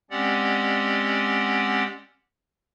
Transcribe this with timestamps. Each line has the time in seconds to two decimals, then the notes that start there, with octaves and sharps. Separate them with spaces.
0.11 G#3 C4 C#4 G4 D5 F#5